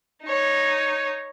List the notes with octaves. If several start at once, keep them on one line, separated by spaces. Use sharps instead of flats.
D#4 C#5